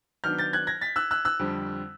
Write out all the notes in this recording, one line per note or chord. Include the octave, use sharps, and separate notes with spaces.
D#3 F#3 B3 D4 F6 G6
G6 A6
F#6 G#6
G#6 A#6
A6 B6
E6 F#6
E6 F#6
E6 F#6
F2 D3 G3 C4